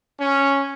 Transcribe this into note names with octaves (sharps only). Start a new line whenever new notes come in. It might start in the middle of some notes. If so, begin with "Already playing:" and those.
C#4